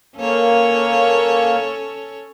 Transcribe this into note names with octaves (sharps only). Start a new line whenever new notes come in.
A#3 C#4 A4 C#5